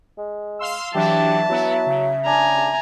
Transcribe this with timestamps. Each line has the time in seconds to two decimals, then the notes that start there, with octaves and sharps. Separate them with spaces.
0.18 G#3
0.59 F5 C6 E6
0.95 E3 F#3 D4 G4 E5 A5
1.50 F#3 B3 E4
1.86 C#3
2.26 D4 G#5 A#5